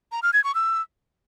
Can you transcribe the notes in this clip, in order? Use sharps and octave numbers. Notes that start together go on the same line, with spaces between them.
A#5
F6
G#6
C#6
E6